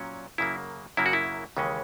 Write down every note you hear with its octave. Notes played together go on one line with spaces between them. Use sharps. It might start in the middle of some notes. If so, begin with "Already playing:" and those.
Already playing: A#2 F#3 C#4
F#2 C#3 F#3 A#3 E4
F#2 C#3 F#3 A#3 E4
F#4
E4
D#2 C#3 E3 G#3 C#4